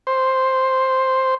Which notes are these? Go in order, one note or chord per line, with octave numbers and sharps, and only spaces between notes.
C5